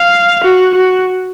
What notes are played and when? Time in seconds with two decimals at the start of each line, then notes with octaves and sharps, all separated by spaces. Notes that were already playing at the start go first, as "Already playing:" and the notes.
Already playing: F5
0.44 F#4
0.75 F#4